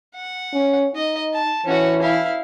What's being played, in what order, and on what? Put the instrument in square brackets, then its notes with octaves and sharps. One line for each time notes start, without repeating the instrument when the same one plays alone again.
[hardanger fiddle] F#5
[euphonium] C#4
[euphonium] D#4 [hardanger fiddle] D#5
[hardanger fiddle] A5
[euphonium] E3 [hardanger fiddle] C#4 F#4
[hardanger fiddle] E4 F5